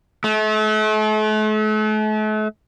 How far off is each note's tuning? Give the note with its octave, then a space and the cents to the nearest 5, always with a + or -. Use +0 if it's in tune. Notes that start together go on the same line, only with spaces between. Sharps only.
A3 -40